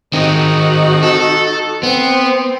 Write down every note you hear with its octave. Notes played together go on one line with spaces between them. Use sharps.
D#3 C4 D#4 F#4
A4
B3 C4